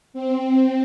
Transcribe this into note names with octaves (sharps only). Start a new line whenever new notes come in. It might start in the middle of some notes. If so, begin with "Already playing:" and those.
C4